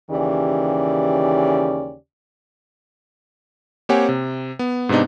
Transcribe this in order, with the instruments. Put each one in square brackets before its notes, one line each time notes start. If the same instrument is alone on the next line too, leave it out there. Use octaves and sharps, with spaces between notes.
[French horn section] D#2 C#3 E3 C#4 G4 D5
[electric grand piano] A#3 C4 G4 C#5 F#5 G#5
C3
B3
G#2 C3 B3 D4 D#4